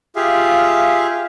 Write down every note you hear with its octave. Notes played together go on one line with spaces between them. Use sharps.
F4 G4 G#4 E5 F5